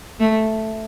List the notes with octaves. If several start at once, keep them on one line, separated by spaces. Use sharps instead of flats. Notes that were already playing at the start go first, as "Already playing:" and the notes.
A3